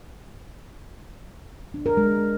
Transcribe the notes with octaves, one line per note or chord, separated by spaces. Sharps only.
D4
A#4
G#3